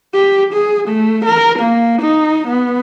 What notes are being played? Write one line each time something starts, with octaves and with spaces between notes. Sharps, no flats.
G4
G#4
A3
A#4
A#3
D#4
B3